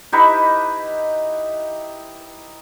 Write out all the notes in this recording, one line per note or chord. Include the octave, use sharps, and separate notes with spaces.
D#4 E4 G4 B4